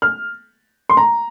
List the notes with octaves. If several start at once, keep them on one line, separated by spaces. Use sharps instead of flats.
F6
C6
A#5